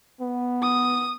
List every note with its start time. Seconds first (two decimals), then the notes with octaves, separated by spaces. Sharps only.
0.21 B3
0.62 D#6